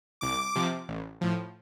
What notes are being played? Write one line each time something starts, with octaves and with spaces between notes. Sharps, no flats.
C2 D6
C3 F3
A1
A2 F3